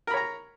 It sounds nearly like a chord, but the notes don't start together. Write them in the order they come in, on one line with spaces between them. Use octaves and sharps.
A#4 B5 C#5 A#5